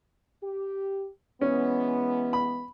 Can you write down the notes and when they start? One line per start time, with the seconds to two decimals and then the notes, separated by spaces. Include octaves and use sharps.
0.42 G4
1.41 E3 G#3 B3 C#4
2.33 B5